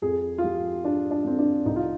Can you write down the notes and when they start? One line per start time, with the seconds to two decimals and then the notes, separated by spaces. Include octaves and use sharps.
0.02 F2 G#4
0.38 F4
0.44 F3 G4
0.83 G#3 D4
1.11 D4
1.24 D3 C4
1.39 D4
1.65 C2 D#4
1.76 F4